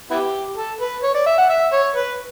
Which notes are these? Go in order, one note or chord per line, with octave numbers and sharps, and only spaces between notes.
B3 E4 G4
A4
B4
C#5
D5
E5
F#5
E5
C#5
B4